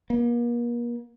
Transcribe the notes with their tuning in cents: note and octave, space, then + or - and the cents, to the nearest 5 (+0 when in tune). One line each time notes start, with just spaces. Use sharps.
A#3 +40